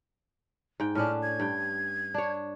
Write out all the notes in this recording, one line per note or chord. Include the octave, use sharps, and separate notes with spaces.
G#2 G5
A2 C#4 D4 F6
G#6
G2 G5
D4 C#5